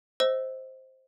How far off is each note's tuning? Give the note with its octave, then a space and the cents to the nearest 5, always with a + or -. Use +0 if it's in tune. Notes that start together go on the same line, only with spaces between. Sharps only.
C5 +0 D#5 +35 E6 +0